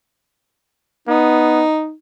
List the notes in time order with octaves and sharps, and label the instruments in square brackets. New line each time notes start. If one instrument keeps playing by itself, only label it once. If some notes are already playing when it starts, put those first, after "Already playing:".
[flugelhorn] B3 [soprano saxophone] D#4